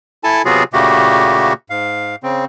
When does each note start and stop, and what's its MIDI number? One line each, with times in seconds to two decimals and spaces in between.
0.24 0.42 64
0.24 0.42 69
0.24 0.42 80
0.24 0.42 81
0.45 0.63 48
0.45 0.63 54
0.45 0.63 59
0.45 0.63 65
0.45 0.63 66
0.45 0.63 68
0.73 1.53 46
0.73 1.53 49
0.73 1.53 57
0.73 1.53 58
0.73 1.53 66
0.73 1.53 67
1.70 2.16 44
1.70 2.16 77
2.23 2.45 49
2.23 2.45 60